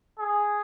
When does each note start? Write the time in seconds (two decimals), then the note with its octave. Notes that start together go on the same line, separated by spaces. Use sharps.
0.19 G#4